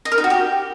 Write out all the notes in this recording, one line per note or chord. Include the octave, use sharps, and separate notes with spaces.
D#5
A#4
D#4
F#4
G4